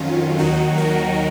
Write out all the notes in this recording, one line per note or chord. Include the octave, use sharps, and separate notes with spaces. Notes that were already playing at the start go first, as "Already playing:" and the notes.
Already playing: F2 D#3 F#3 C#4 F4
D#2 D#3 F#3 D#4 F#4
F#4 A#4